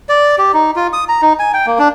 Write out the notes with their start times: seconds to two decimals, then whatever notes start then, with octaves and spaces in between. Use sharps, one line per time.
0.09 D5
0.38 G4
0.54 D#4
0.76 F4
0.93 D#6
1.09 A#5
1.22 D#4
1.39 G#5
1.54 G5
1.66 A#3
1.79 D4